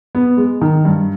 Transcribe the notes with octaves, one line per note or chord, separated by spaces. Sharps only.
B3
G#3
D#3
G2